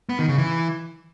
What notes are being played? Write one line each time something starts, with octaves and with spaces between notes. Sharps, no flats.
B3
D#3
C#3
E3